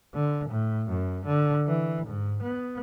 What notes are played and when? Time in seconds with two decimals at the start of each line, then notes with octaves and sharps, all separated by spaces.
0.14 D3
0.49 A2
0.89 F#2
1.26 D3
1.67 E3
2.07 G#2
2.43 B3